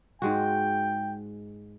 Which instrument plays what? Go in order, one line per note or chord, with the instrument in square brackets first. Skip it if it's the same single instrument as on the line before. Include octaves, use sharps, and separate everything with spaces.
[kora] G#2 G#3 F#4 [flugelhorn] G5